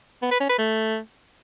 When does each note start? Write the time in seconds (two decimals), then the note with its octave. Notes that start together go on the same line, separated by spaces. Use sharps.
0.22 B3
0.31 B4
0.40 C#4
0.49 B4
0.58 A3